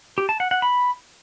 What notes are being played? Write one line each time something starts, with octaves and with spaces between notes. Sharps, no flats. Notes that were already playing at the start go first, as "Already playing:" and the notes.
G4
A5
F#5
F#5
B5